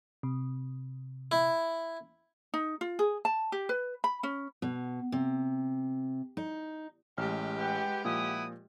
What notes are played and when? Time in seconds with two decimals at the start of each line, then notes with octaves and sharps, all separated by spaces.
0.23 C3
1.32 E4
2.54 D#4
2.81 F4
2.99 G#4
3.25 A5
3.52 G4
3.69 B4
4.04 B5
4.23 C#4
4.62 B2
5.12 C3
6.37 D#4
7.18 A1 G#3 G4 F6
7.59 B4 F#5 G5
8.05 A#2 F3 E4 F#5 D#6